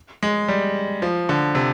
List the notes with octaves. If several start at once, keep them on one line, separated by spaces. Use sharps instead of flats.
G#3
G3
F3
D3
C3